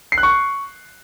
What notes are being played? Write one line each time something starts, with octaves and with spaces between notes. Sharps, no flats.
C7
F#6
C#6